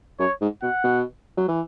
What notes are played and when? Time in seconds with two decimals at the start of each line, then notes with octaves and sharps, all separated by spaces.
0.20 F#2 C#5
0.41 G#2
0.63 B2 F#5
0.84 B2
1.37 F#3
1.48 E3